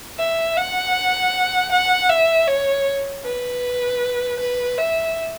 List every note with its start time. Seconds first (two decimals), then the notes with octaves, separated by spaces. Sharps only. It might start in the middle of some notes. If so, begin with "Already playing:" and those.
0.18 E5
0.57 F#5
1.72 F#5
2.10 E5
2.48 C#5
3.24 B4
4.40 B4
4.78 E5